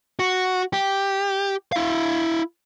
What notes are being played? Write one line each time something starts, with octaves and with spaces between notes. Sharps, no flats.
F#4
G4
E4 F5